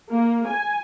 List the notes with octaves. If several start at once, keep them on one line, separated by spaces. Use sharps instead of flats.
A#3
G#5